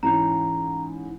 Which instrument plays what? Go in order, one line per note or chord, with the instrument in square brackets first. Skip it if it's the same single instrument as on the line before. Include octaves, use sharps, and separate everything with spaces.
[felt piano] G#2 E3 C#4 [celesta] A#5